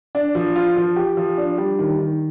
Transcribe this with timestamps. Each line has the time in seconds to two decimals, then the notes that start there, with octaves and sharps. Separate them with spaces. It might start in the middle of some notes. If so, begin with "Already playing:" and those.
0.15 D4
0.35 F3
0.56 F4
0.76 F3
0.96 G4
1.17 F3
1.37 D4
1.58 G3
1.79 D#3
1.99 D#3